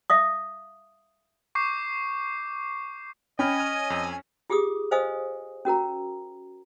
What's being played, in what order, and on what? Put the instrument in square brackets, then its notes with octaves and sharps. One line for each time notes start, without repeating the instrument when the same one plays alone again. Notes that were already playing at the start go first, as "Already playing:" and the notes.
[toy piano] E5 F5 D#6
[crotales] C#6 D6 G6 C7
[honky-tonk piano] C#4 [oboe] D#5 [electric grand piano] G5 B5 F6 [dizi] G#5
[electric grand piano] F6
F2 E6
[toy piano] F4 G4 G#4 D6 D#6
B4 C5 D#5 F5 G#5 D#6
C#4 F#4 A#4 A#5